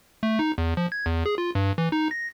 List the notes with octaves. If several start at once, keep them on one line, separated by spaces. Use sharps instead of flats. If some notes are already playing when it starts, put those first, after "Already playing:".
A3
D#4
E2
F3
G#6
E2
G#4
F4
G2
E3
D#4
A#6